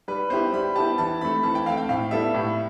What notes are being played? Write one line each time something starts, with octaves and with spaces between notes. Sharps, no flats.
G3 B4
B3 E4 G4 C5
G3 B5
B3 E4 G4 A5
E3 A5
A3 C4 B5
E3 A5
G5
A3 C4 F5
G5
A2 F5
G3 B3 E4 A4 E5
A2